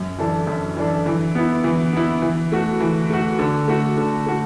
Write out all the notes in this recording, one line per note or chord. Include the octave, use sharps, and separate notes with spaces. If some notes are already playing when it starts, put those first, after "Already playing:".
Already playing: F#2
E3 D4 A4
F#2
E3 D4 A4
E3
B3 E4
E3
B3 E4
E3
A3 F#4
E3
A3 F#4
D3
A3 F#4
D3
A3 F#4